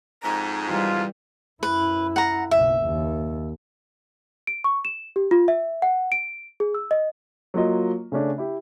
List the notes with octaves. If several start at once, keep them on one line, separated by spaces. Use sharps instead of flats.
F2 G#2 A#5
E3 G3 F4
F#2 E4 B4
F#5 A#5
F#1 B1 E5
D#2
D7
C#6
E7
G4
F4
E5
F#5
D7
G#4
E6
D#5
F#3 A#3 F4 D#5
C#3 A3 C#4 D4
E4 G4